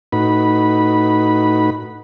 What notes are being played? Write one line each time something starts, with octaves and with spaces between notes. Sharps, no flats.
A2 D#4 F#4 B4 B5